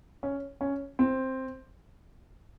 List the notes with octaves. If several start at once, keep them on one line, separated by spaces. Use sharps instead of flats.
C#4
C#4
C4